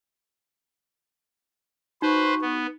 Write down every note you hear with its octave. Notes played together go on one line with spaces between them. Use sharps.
D#4 F#4 B4 C5
B3